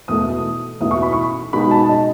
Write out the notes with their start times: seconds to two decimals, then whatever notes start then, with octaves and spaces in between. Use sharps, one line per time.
0.08 E2 B2 A3 E4 D#6
0.80 E2 B2 A3 E4 D#6
0.91 C#6
1.03 B5
1.13 C#6
1.53 B2 G#3 D#4 B5
1.71 A5
1.89 D#5